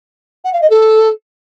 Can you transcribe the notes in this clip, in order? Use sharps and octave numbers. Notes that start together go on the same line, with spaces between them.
F#5
F5
D#5
A4